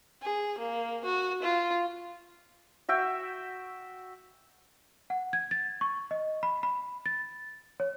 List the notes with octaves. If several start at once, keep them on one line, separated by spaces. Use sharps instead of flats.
G#4
A#3
F#4
F4
F#4 E5 G5
F#5
G#6
A6
C#6
D#5
B5
B5
A6
C#5